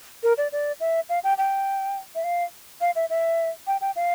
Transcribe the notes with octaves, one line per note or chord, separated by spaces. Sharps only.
A#4
D5
D5
E5
F5
G5
G5
E5
F5
F5
E5
E5
G5
G5
F5